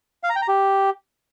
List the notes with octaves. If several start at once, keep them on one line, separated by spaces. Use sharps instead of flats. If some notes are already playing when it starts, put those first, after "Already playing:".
F5
A#5
G5
A#5
G4